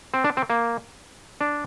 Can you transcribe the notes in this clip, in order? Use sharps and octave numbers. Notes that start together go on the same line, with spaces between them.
C4
D4
C4
A#3
D4